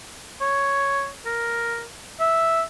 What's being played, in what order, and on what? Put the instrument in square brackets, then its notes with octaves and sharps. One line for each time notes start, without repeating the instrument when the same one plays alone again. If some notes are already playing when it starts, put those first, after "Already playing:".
[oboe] C#5
A#4
E5